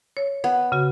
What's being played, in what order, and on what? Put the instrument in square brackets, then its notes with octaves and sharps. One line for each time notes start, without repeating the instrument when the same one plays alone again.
[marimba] C#5
[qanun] B3
[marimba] C#3 F#4